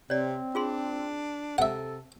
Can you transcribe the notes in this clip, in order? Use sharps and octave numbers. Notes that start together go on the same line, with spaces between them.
C3 C4 C#5 D5
D4 F4 G#4 C6
C3 A4 E5 F#5